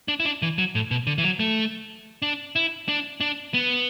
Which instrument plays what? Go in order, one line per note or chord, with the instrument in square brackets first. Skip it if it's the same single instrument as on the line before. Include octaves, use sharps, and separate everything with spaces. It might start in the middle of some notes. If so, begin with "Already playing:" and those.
[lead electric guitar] D4
E4
D4
E3
F#3
A2
B2
D3
E3
F#3
A3
D4
E4
D4
D4
B3